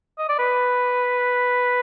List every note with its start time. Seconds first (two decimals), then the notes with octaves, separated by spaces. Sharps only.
0.18 D#5
0.29 D5
0.38 B4